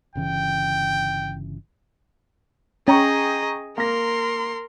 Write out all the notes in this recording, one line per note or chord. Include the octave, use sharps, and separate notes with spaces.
G1 C#3 E3 G5
C#4 G#4 D#5 G5 A#5 C#6
A#3 A#4 C6 A#6